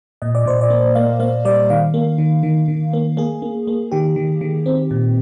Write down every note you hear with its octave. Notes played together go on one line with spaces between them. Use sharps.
A#2 D#5
D5
A#2 C5
D5
A#3
A#3 F5
A#3 F5
G3 D5
D#3 F5
A#3
D#3
D#3
D#3
A#3
A#3 G#4
A#3
A#3
D#3 G4
D#3
D#3
C4
A#2